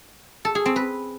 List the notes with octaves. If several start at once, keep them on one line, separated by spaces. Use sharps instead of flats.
A4
G#4
C4
B4